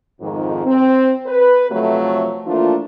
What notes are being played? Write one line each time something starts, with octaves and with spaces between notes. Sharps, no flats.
F2 G#2 D#3
C4
B4
C3 F3 F#3 A3
E3 F3 A3 A#3 D4 F4